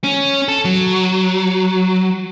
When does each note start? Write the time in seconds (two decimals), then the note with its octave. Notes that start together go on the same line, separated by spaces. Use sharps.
0.04 C#4
0.48 A4
0.65 F#3